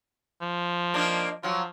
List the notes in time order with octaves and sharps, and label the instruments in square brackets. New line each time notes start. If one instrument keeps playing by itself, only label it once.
[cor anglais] F3
[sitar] A#3 D4 D#4
[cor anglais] F3 [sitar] F#3 F4